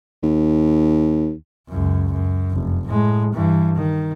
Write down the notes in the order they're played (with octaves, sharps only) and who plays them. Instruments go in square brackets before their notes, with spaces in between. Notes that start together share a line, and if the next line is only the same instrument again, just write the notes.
[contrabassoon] D#2
[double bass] C#2 F#2
F#2
F1
A2 G#3
G2 E3
D#3